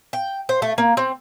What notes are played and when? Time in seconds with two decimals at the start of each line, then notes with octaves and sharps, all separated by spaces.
0.13 G5
0.49 C5
0.62 A3
0.78 A#3
0.97 C4